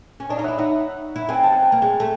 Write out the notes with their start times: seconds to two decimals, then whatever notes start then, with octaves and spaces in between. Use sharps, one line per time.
0.20 C#4
0.29 D4 C#5 D#5
0.37 D#4 F5
0.44 E4 E5 F#5
0.58 D#4 E5 F#5
1.16 E4
1.29 C4 F#5 G#5
1.43 G5 A5
1.52 F#5 G#5
1.62 G5 A5
1.72 A#3
1.82 G#3
2.00 A3